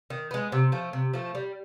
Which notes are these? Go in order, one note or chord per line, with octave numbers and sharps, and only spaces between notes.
D#3
G#3 B3
C3
F3 A3
C3
F3 A3
G3